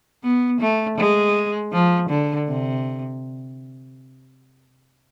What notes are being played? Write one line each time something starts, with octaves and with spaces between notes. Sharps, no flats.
B3
A3
G#3
F3
D3
C3